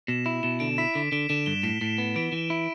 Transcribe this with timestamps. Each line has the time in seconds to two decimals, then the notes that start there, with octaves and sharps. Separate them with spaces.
0.08 B2 E7
0.26 E4 E7
0.43 B2 E7
0.60 D3 D7
0.78 E4 B6
0.94 D3 B6
1.12 D3 D7
1.29 D3 E7
1.46 G2 G7
1.63 A2 E7
1.81 A2
1.98 B3
2.16 E3 D7
2.32 E3
2.50 E4